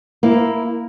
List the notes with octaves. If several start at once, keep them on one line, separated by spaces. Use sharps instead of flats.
A#3 E4